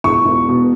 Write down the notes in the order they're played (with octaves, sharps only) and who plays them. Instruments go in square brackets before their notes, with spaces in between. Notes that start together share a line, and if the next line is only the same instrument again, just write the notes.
[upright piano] E1 C#6
E1
B2